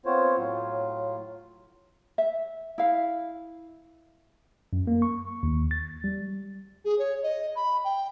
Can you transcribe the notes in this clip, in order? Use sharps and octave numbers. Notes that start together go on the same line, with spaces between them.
B3 C4 F4 C5 C#5
A2 F#3 F4
E5
E4 F5
F#2
A#3
C#6
D#2
A6
G3
G#4
C#5
D#5
B5
G5